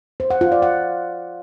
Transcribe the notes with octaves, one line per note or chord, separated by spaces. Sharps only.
C5
F#5
F4
D5
F#5